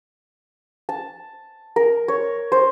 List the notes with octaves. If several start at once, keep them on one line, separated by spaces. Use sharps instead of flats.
A5
A#4
C#5
C5